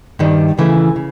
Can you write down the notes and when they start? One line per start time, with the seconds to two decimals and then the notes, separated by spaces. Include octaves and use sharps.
0.19 G2 D#3 G3
0.58 D#2 C#3 E3 A3
0.96 C#3